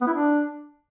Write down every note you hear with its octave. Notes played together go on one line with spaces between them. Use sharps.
B3
E4
D4